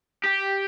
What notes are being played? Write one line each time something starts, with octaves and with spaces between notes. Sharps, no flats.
G4